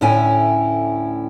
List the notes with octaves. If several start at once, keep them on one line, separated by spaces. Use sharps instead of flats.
D2 A2 C#4 E4 G5 G#5